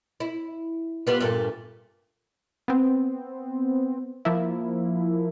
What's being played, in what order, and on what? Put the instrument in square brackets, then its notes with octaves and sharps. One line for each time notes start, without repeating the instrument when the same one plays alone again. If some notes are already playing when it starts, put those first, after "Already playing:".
[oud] E4
G3 B3 F4
G2 A#2 A3
[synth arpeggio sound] B3 C4
F3 A#3 E4